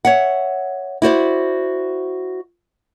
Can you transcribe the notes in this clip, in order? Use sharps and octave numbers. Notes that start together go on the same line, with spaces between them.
C#5 E5 F#5
E4 F#4 C5 D5